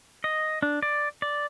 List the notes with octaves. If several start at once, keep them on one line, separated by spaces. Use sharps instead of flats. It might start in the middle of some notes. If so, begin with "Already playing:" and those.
D#5
D4
D5
D5